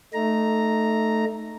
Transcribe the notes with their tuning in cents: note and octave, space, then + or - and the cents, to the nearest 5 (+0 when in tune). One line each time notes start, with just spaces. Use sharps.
A3 +0 D#4 -15 A#5 +0